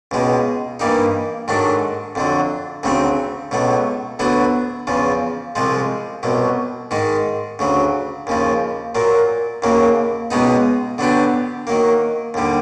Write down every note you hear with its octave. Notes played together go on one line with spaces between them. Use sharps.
C#2 B2 G#3
G2 E3 G3 A#3 D#4
G#2 D#3 F#3 A3 D4
F2 D3 F#3
D2 C#3 F#3 A3 C4
C#2 B2 F#3 A3
D2 D3 F#3 B3 E4
E2 C#3 F3
C2 C3 F3 G#3
C2 B2 F#3
G#2 D#3 G#3
D2 C#3 F#3
D#2 C#3 F3
A#2 F#3 A#3
D#2 C#3 F#3 A#3
C#2 B2 G#3 B3 D#4
D3 F#3 B3 D4 G4
D#3 F#3 A#3
D#2 D3 G3